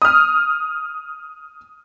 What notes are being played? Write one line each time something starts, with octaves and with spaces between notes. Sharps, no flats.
D#6 F6